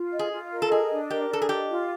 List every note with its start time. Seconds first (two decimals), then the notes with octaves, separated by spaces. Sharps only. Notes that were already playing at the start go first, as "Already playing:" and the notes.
Already playing: F4
0.12 D#5
0.19 G#4
0.32 F4
0.51 A#4
0.62 A4
0.70 G#4 D#5
0.91 D4
1.10 G4 A#4
1.29 D4 A4
1.42 G#4
1.49 G4 D#5
1.69 F4